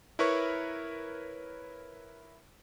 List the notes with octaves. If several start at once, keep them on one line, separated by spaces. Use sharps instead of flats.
E4 A#4 B4 C#5 C#6